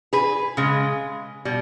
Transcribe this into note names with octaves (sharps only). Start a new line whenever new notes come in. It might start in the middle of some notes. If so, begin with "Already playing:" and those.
G#4 B4
C#3 G#3
B2 G3